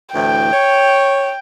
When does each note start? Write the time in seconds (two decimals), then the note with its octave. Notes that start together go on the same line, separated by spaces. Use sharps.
0.15 D2 A2 E3 G5
0.52 C#5